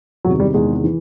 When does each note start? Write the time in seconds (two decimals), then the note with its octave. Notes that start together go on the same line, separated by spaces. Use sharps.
0.25 E2 C3 D#3 F#3
0.40 G3
0.54 E2 C3 D#3 G#3
0.84 E3